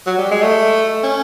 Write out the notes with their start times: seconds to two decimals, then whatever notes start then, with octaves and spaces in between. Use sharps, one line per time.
0.06 F#3
0.18 G3
0.31 G#3
0.42 A3
1.03 C#4